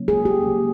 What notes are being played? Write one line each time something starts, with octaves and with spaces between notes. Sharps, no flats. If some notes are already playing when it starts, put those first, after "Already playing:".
Already playing: C#3 F#3 A#3 C#4
G#4
G4
C#3 F#3 A#3 C#4